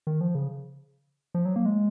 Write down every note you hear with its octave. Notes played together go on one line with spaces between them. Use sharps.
D#3
F3
C#3
F3
F#3
A#3
G#3